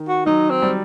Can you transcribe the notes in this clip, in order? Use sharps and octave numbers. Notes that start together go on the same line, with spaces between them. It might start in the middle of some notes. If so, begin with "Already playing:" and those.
Already playing: D#3
F#4
F#3 D#4
C4
G3